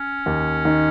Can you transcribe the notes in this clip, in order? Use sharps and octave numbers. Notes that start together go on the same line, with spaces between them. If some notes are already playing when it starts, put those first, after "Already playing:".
Already playing: C#4
D#2
D#3